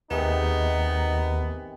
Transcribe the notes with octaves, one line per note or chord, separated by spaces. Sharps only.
D#2 C3 D#3 B3 D#4 G#4